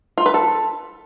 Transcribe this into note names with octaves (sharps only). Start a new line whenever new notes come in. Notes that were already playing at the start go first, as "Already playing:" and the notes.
F4
B4
A4